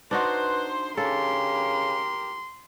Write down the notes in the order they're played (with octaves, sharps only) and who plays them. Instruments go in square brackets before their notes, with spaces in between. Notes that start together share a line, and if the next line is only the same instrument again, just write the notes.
[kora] D4 D#4 F#4 [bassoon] B4 [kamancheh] C5 C6
[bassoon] C#3 [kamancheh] G4 A#4 [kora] A4 [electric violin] C6